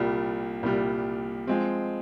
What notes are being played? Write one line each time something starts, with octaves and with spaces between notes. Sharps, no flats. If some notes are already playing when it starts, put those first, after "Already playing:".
Already playing: C2 A#2 G3
C2 A#2 G3
F3 G#3 C4